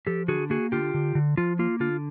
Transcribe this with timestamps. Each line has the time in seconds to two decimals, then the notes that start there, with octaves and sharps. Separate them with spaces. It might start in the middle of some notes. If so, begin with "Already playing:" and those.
0.07 F3 G4 A4
0.28 D3 F#4 G#4
0.50 A#3 F#4 G#4
0.72 D3 F4 G4
0.94 D3
1.15 D3
1.37 F3 F4
1.59 A#3 F4
1.80 D3 F4